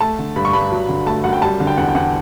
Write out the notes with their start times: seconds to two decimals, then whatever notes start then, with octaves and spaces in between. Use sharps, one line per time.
0.01 A3 A5
0.19 D3
0.36 G2 B5
0.45 C#6
0.53 G2 B5
0.72 F#3
0.89 D3
1.06 A3 A5
1.24 F#2 F#5
1.33 G5
1.42 G3 A5
1.60 D3
1.67 G5
1.77 E2 F#5
1.88 G5
1.95 E2 F#5